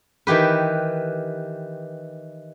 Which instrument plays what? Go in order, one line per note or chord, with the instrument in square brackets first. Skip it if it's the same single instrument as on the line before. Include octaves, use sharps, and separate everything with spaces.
[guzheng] D#3 E3 G4 B4